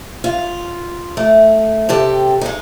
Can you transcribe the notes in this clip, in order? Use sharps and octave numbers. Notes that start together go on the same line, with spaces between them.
F4
A3
C3 G4 A4 G5
G#3 D#4